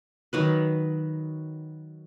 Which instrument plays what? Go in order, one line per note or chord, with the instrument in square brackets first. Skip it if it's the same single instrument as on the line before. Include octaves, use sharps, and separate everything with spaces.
[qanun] D#3 F#3 B4